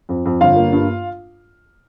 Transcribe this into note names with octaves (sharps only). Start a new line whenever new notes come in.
F2
F2
G1 F4 F5
A#3
G2